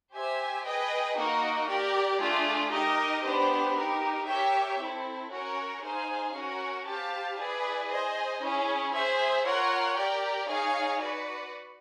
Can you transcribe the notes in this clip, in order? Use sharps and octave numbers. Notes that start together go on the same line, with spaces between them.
G4 C5 E5 G#5
G#4 B4 D#5 G5
A#3 D#4 F#4 A#4 D#5
G4 A#4 D5 G5
A3 D4 F4 G#4
D#4 G4 A#4 D#5
B3 D4 G4 C5
D#4 G4 A#4
G4 A#4 C#5 E5 G5
C4 E4 A4
C#4 F#4 A#4 C#5
D#4 G#4 C5 F5 G#5
C#4 F#4 A#4
G4 C5 F5 A5
E4 G#4 B4 D5
G#4 C5 D#5 G#5
C#4 E4 G#4
G#4 C5 E5
F4 A#4 C#5 F#5
G4 A#4 D5 G5
D#4 G#4 C#5 F5 G#5
F#4 B4 D5